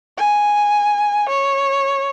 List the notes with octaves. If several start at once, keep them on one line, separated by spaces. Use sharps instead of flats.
G#5
C#5